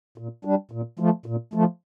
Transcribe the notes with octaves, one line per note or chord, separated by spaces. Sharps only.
A#2
G3 D4
A#2
F3 A3
A#2
F3 A3